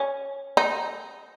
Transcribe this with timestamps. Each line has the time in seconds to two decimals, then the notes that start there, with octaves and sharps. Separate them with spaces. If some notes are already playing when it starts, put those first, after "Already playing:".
Already playing: C#4
0.57 D#4